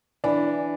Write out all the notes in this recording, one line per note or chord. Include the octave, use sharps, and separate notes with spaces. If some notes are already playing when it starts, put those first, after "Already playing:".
E3 D4